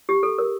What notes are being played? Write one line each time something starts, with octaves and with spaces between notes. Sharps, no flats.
G4
A4
A#4